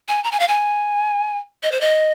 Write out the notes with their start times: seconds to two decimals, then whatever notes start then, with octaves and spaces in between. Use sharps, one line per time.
0.08 G#5
0.24 A#5
0.32 G#5
0.40 F5
0.48 G#5
1.63 D#5
1.72 C5
1.81 D#5